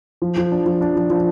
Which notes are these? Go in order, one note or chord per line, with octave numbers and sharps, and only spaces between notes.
F3
F3
D4
F3
D4
F3
F3